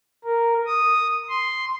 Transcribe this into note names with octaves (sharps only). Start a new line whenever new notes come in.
A#4
D#6
C6